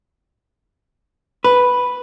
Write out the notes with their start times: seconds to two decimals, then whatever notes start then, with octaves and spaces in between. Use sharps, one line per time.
1.44 B4